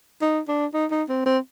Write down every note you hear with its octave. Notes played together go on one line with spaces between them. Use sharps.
D#4
D4
D#4
D#4
C4
C4